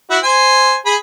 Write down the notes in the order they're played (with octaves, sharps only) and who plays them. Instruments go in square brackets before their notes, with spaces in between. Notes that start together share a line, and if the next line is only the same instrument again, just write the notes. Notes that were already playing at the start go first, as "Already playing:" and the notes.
[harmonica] E4 F#4
C5 G#5
G#4 B5